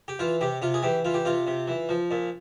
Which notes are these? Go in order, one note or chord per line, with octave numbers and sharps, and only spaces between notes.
G4
E3 F4
C3 G4
C3 F4
G#4
E3 G4
E3 F4
G4
C3 F4
C3
E3
F3
A#2